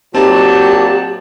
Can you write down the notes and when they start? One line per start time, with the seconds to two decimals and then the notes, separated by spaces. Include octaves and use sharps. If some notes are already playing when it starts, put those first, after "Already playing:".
0.15 A#2 F#3 C4 D#4 G4 A5